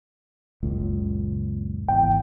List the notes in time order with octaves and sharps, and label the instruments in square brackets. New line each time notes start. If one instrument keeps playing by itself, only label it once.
[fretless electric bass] F#1 C#2 A#2
[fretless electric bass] G#1 E2 [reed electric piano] G5